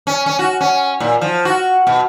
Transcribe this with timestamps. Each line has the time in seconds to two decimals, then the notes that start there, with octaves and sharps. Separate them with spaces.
0.07 C#4
0.26 C#4
0.39 F#4
0.61 C#4
1.00 A#2
1.21 F3
1.45 F#4
1.87 B2